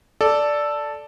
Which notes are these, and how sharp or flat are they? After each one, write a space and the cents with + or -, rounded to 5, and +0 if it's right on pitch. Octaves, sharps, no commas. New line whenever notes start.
A4 +0 D5 +0